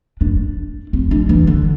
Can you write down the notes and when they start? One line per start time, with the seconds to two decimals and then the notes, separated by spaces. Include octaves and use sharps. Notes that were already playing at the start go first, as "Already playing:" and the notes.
0.21 D4
0.93 C4
1.11 D4
1.29 E3
1.47 D3